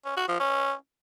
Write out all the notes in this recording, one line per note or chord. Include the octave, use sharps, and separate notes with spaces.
C#4
F#4
F3
C#4